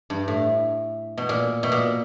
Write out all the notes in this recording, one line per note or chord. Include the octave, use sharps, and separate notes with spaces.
G2
A2
B2
A#2
B2
A#2